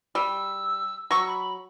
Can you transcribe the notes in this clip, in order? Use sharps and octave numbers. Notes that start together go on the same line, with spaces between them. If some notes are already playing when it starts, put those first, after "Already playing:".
G3 E6
F#3 C#6 E6
B5